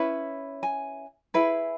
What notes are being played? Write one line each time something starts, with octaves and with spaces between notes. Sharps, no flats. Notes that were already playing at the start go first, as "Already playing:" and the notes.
Already playing: C#4 E4 B4
G#5
E4 G#4 B4